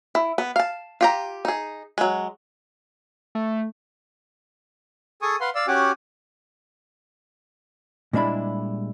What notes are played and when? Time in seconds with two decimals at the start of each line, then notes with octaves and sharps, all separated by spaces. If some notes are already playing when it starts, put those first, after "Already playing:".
0.15 E4
0.38 B3
0.56 F5 A5
1.01 F4 G4 A#5
1.45 D#4 G#4
1.98 F#3 G#3
3.35 A3
5.22 G#4 A4 G#5 C#6 D#6
5.41 B4 F5 F#5 C6
5.55 D5 F5 E6
5.68 C#4 F#4 G4 F#5 G#5 D6
8.13 A#2 G3 G#3 D4 E4 B5